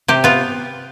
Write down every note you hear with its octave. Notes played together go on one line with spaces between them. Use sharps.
C3 G4
B3 F4